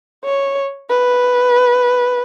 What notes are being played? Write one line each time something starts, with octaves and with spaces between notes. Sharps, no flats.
C#5
B4